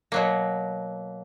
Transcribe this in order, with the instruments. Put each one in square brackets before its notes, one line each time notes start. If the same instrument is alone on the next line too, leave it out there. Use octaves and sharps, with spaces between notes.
[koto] B2 F#3 A#3